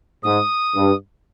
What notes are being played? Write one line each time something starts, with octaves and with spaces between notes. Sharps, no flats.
G#2 D#6
G2